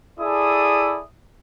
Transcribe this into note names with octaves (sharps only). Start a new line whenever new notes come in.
E4 G#4 A4 D5 D#6